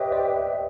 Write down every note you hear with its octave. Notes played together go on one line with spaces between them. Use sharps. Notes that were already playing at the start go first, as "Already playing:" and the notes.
Already playing: G4 B4 C#5 D#5 E5 G5
C5 D5